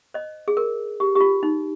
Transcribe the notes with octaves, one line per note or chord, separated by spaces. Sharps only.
C5 D#5
G#4
A#4
G4
G4
F4
D#4